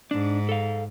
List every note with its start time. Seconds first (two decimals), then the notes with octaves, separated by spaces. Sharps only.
0.11 G#2 D4
0.49 A4 F5